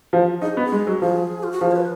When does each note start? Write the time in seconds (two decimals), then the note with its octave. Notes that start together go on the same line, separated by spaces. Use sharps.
0.13 F3
0.42 D#4 G#4
0.54 B3 F#4
0.64 G#4
0.72 G#3
0.87 F#3
1.02 F3 G#4
1.43 F4
1.52 F#4
1.61 F3 G#4
1.71 C#5
1.76 B4